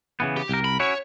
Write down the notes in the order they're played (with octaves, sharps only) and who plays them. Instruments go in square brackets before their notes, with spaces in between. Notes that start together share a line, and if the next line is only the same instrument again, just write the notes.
[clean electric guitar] C#3 E3 B3
[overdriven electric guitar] G4
[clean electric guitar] C2 A#4
[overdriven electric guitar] B5
[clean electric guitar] C#4 E4 F#4 [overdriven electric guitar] C#5